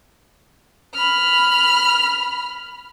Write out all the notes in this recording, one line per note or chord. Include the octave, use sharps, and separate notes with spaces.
B5 F6